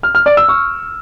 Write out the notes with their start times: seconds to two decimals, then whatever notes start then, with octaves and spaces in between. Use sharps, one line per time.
0.03 F6
0.15 F6
0.26 D5
0.37 E6
0.48 C#6